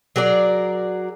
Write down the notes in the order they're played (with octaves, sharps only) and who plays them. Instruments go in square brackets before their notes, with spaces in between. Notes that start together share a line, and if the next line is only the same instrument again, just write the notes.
[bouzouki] F#3 G#4 A#4 D5